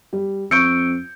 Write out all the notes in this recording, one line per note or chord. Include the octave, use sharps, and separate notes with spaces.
G3
F2 C#6 E6 G6 C#7 D7